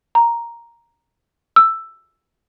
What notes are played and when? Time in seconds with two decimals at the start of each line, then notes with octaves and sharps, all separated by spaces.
0.15 A#5
1.56 E6